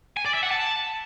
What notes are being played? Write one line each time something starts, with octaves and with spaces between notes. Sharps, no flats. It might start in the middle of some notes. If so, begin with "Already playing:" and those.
G#5
D5
E5
F#5
A5